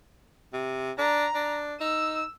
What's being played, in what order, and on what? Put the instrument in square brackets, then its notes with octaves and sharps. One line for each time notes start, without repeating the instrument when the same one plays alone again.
[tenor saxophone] C3
[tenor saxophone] D4 [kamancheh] A#5
[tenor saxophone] D4
[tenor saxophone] D#4 [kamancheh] E6